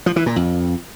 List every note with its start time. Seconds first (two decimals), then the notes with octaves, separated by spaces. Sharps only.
0.06 F3
0.16 E3
0.26 A#2
0.36 F2